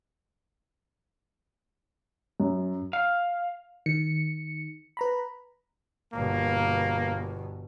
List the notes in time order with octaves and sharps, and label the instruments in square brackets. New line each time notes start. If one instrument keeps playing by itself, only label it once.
[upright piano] F#2
[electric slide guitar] F5
[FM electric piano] D#3 C#7
B4 A#5 B5
[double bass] G1 B2 [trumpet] A#3